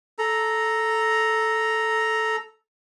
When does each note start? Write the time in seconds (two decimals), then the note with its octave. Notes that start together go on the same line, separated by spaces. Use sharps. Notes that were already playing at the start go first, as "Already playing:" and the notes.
0.19 A4 A#5